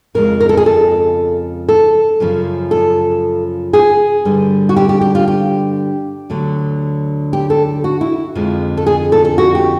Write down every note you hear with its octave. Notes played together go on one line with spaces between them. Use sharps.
F2 C#3 F3 G#3 A#4
A#4
A4
G#4
A4
A4
F#2 C#3 F3
A4
G#4
G2 D3 G3
F#4
G4
G4
G4
F4
G4
D2 D3 F#3
G4
A4
F#4
E4
F2 D3 F3 G#3
A4
G#4
A4
A4
F#4
G4